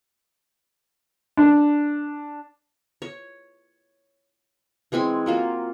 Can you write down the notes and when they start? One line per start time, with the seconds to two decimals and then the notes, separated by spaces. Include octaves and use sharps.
1.37 D4
3.02 C#5
4.92 E3 G#3 C4 G#5
5.26 F#3 A#3 F4